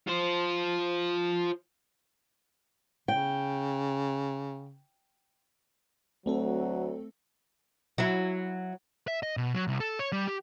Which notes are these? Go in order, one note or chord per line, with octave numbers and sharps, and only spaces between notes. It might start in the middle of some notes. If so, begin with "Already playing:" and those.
F4 C5
C#3 G5
D2 F#3 A3 C4 A4
F#3 E4
E5
D#5
B2
F#3
C2
A4
C#5
G3
G4